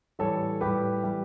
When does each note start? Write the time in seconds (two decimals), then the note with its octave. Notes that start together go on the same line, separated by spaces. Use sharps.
0.19 A2 E3 G3 A4 C#5
0.61 A2 G3 G4 B4
1.04 E3 G3